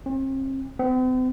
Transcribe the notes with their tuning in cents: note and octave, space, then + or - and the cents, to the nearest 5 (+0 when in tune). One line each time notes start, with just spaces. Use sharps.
C4 +40
C4 -45